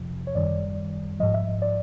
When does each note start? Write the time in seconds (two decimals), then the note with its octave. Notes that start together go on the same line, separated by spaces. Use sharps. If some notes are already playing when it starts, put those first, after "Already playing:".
Already playing: F2 C3 F3
0.27 C#5
0.35 F#2 D#3 G3 D5
1.20 F3 D#5
1.23 G#2
1.34 E5
1.62 D5